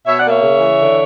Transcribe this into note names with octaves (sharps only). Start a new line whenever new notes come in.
B2 C#5 E5
D5 F#5
A#3
C#5 E5
C#3
E3
D3